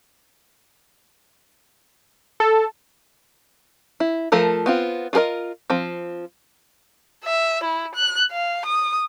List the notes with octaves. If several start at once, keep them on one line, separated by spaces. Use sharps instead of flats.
A4
E4
F3 A3 A4 A#4
B3 C4 F4
F4 F#4 G#4 A#4 D#5
F3 C4
E5
E4
F#6
F5
D#6